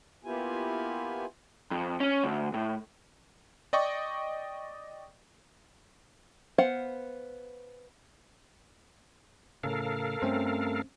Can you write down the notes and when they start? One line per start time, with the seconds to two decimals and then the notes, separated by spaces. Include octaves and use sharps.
0.25 A#3 B3 E4 F4 G4 G#5
1.71 F2
2.00 C#4
2.24 D2
2.54 A2
3.73 D5 D#5 G5 C#6
6.58 B3 C5 F5 F#5
9.63 A2 C#3 A4 A#4 F5
10.22 G2 A3 C4 C#4 C5